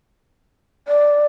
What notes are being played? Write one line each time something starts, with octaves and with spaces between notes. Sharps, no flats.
D5